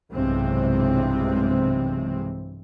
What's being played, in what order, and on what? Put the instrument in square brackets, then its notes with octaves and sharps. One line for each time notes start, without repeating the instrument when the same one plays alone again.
[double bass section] B1 G2 C3 E3 G#3 C4